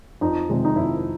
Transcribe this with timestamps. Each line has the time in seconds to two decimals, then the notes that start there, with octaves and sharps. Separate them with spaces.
0.21 F2 D#4
0.49 C3 D#3 G#3
0.65 D#4
0.76 F2 E4